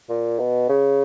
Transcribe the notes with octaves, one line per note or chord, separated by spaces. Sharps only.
A#2
B2
C#3